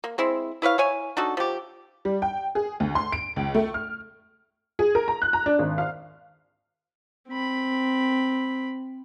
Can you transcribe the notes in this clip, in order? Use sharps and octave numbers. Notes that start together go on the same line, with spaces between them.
A#3
G#3 C4 E4
E4 B4 C#5 F5
E4 C#5 G#5
D4 D#4 F#4 A4
F3 G4
G3
G5
G#4
D2
C6
D7
C#2
A3
F6
G#4
A#4
A#5
F#6
A#5
D4
G#1
F5
C4 B5